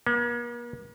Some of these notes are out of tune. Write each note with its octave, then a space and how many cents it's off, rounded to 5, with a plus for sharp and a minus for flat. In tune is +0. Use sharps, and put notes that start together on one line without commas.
A#3 +45